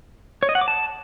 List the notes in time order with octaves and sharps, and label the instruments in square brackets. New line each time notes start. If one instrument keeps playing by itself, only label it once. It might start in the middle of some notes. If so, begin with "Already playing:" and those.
[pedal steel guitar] C#5
D#5
F#5
D6
A5